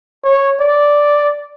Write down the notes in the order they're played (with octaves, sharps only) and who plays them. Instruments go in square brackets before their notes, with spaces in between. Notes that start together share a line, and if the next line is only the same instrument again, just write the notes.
[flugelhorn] C#5
D5